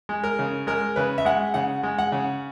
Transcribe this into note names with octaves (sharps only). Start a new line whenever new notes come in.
G#3
A#4
C#3
G#3 A#4
C#3 B4
E5
G#3 F#5
C#3 F#5
G#3
F#5
C#3